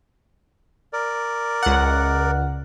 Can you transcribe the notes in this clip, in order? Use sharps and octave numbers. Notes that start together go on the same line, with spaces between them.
A#4 D5
C#2 F#5